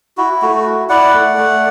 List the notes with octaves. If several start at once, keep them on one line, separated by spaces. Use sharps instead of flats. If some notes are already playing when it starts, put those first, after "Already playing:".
E4 F#4
A3 F#4
E4
E4 D5 F#5
A3
A3